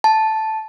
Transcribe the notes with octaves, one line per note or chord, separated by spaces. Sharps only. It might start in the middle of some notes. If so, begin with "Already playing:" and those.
A5